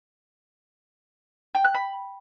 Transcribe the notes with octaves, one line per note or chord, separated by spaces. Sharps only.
G5
F#6
B5